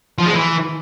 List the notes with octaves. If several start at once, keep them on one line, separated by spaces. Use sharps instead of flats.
F3
G#3
E3